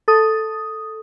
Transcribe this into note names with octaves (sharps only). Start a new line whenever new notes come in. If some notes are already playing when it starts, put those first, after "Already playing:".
A4 D#6